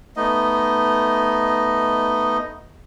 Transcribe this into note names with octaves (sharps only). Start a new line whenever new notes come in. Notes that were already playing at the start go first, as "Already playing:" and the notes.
A3 B3 D#4 D#5